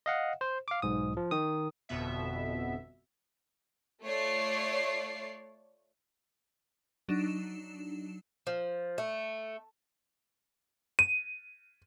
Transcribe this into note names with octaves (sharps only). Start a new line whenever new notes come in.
D#5 F5 F#5
C5
F5 D6
B1 G#2 D#6
F3
D#3 D#6
G1 F2 B2 B3 E5
A3 F4 C#5 D5 C7
F#3 D4 D#4 E7
F3
A3
D#7